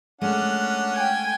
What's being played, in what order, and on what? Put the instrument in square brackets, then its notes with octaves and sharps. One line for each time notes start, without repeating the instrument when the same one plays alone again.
[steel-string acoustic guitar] G#3 A3 [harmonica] C#4 D4 F#5
[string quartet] G5 G#5